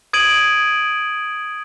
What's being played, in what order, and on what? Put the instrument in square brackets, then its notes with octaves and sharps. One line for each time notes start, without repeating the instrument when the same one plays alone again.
[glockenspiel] D#6 G#6 D7 D#7 F#7